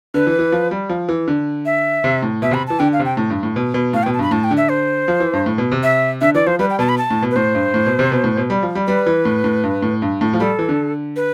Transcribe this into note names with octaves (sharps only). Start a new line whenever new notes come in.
D3 B4
E3
E3
F3
G3
F3
E3
D3
E5
C3
A2
B2 E5
C3 B5
E3 A5
D3 G5
F5
C3
G5
A2
G2
A2
B2
B2
A2 F5
G5
B2
A5
G2 B5
A2 A5
G5
D3
E5
C5
F3
E3
G2
A2
B2
C3
E5
D3 E5
E3 D5
F3 C5
G3 B4
G5
B2 A5
B5
A5
A2
B2
B4
A2 C5
G2
A2
B2
C3
B2
A2
B2
G3
F3
G3
G3 B4
E3
A2
A2
G2
A2
G2
A2
F3
G3 A4
E3
D3
B4